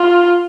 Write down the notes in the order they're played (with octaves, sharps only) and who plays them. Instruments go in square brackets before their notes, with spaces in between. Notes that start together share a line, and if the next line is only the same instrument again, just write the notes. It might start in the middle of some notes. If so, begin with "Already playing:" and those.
Already playing: [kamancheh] F4